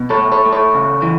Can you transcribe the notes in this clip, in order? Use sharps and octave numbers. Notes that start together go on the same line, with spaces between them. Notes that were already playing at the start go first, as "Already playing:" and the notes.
Already playing: B2
A4 C#5
A3
A4 C#5
A3
A4 C#5
C#3
E3